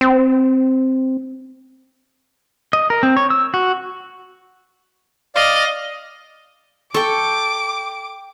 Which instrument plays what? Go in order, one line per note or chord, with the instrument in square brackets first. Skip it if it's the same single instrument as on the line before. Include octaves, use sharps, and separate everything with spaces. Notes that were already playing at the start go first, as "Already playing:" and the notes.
[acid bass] C4
[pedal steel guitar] D#5
A#4
C4
C#5
E6
F#4
[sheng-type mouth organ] D5 F5 [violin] D#5
[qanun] A4 [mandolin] G5 C#6 [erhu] D6